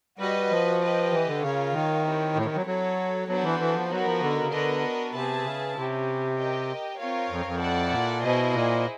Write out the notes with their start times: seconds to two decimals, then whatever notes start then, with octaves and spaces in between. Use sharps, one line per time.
0.18 G3 F#4 B4 D#5
0.50 F3
0.81 G4 B4 D#5
1.12 E3
1.27 D3
1.42 C#3 F4 A#4 C#5 F5
1.73 D#3
2.05 C4 E4 G4 A#4 C#5
2.36 A2
2.46 D#3
2.56 F#3
2.66 F#3 F#4 A4 C#5
3.28 F#3 B3 D4 F#4 A4 C5
3.44 E3
3.59 E3
3.75 F3
3.90 F#3 B3 D#4 F#4 A#4
4.05 F3
4.21 D3
4.40 C#3
4.51 D3 B3 D4 F#4 A#4 D#5
5.13 C3 G#4 B4 E5 A5
5.44 C#3
5.75 C3 C#4 E4 G4
6.37 G4 A#4 D#5 G5
6.99 C4 F4 A#4 C#5 F5
7.29 F2
7.46 F2
7.60 E4 A4 D5 F#5 A5
7.91 A#2
8.22 B2 E4 G#4 C5 D#5
8.53 A#2